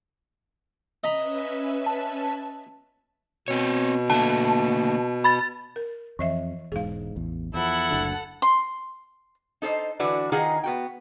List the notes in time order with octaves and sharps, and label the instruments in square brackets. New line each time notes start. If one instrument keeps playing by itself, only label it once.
[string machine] C#4 B4 E5 [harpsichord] D#5 A#5 B5
[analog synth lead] A5
[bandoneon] B2 [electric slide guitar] C4 C#5
[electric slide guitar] D3 A3 A#3 [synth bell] A5
[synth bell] B5 A6
[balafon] A#4
[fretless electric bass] F2 [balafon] E3 D#5 E5
[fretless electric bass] E1 G#2 [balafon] G#4 F5
[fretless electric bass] A1 E2
[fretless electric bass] E2 F3 [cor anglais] E4 [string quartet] A4 F#5
[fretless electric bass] F#1 D2 D3
[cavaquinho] C6
[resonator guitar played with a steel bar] D#4 A4 C5 D#5
D3 E3 D4 F#4 B4 D5
D#3 D#4 F4 G#4 F#5
B3 F#4 G5